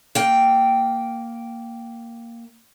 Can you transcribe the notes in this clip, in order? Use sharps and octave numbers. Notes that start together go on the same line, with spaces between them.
A#3 G5